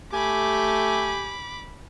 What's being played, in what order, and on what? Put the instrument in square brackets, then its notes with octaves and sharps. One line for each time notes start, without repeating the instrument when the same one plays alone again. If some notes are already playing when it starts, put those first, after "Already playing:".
[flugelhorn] A3 [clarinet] G4 [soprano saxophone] G#5 [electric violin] B5 D6